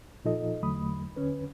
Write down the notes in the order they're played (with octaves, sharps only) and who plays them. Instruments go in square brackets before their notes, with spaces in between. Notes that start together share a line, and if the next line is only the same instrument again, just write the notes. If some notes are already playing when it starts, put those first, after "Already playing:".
[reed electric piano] A#2 F3 D#4 F4 A4 D#5
E2 D3 F#3 A3 B5 D#6
D#2 D3 C#4 B4